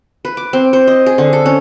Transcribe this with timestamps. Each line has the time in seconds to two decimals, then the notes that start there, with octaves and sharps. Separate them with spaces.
0.25 B4
0.37 D6
0.53 C4
0.73 C5
0.88 D#5
1.06 G#4
1.18 D3
1.33 A4
1.46 C#4